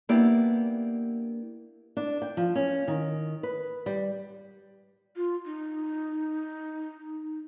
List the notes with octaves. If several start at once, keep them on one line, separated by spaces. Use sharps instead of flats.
A#3 B3 D4 E4 G4 D5
D4
G5
F3
C#4
D#3
B4
G3
F4
D#4